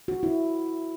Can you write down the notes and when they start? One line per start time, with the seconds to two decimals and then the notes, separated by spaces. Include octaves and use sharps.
0.08 F#4
0.23 E4